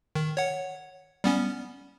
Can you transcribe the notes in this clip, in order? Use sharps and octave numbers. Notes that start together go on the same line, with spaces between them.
D#3
C#5 F#5
G3 B3 C#4